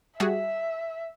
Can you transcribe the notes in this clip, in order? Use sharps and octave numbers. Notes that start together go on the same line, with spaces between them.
G3 F#4 G#4 E5